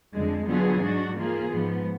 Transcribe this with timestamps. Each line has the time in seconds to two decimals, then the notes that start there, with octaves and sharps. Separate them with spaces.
0.13 F2 D3 G#3
0.47 D3 F#3 B3 F4 G#4
0.82 G#2 F#3 D4 F#4
1.17 F3 A#3 F4 G#4
1.51 G#2 F3 B3